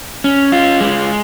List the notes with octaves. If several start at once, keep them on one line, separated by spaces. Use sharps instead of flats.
C#4
F4
G#3